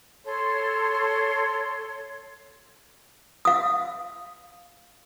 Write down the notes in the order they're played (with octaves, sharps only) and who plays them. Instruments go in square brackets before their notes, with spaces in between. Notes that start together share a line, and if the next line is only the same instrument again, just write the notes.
[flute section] A4 C#5 C6
[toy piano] F5 D#6